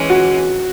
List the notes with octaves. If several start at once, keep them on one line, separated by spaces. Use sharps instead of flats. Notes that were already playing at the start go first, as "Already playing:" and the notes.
Already playing: E3 G#3 C#4
F#4